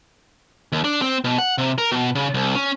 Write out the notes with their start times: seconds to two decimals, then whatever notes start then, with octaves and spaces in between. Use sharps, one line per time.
0.72 D#2
0.84 D4
1.02 C4
1.24 B2
1.38 F#5
1.58 C3
1.78 A#4
1.92 B2
2.15 C#3
2.34 C2
2.55 C#4